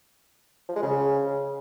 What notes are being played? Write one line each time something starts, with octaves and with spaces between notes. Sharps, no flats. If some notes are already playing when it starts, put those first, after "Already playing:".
F3
G#3
C#3